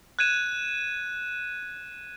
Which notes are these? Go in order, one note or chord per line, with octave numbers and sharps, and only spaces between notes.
F#6 G#6 D#7 E7